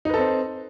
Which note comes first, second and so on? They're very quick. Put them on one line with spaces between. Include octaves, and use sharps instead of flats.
D#4 B4 A4 C4